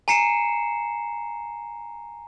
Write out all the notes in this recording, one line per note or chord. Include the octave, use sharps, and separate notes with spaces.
G#5 A#5 C7 C#7 E7